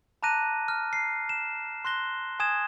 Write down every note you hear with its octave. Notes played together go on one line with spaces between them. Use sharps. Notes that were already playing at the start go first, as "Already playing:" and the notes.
A5 A#5 D6 F#6 A#6 D#7
F6
C7
E7
C6 F#6 A#6 G7
G#5 D#6 G#6 E7